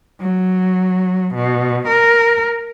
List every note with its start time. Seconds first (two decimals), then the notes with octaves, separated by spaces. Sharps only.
0.21 F#3
1.35 B2
1.88 A#4